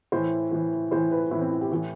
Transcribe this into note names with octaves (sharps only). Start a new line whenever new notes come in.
A2 E3 C5
A2 E3
A2 E3 C5
B4
A2 E3 E4
C4
E4
G4
A2 E3